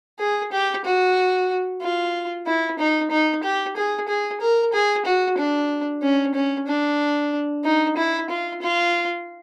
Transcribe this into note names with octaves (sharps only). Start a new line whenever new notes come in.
G#4
G4
F#4
F4
E4
D#4
D#4
G4
G#4
G#4
A#4
G#4
F#4
D4
C#4
C#4
D4
D#4
E4
F4
F4